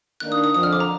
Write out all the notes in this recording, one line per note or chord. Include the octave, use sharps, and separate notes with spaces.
D#3 A#3 D4 F#6
D#6
D#6
F2 D3 F3 D#6
F6
D6
A#5